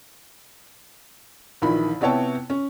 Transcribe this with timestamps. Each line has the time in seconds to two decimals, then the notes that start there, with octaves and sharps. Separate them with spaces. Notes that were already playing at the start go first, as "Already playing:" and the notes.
1.62 A#1 D#3 E3 B5
2.01 C3 B3 E4 C#5 G5 A5
2.50 C#4